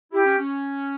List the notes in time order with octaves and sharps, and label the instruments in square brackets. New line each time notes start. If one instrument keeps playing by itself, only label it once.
[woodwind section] E4 [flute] G4
[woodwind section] C#4
C#4